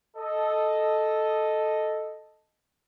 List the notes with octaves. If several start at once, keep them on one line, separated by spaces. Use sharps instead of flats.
A4 D#5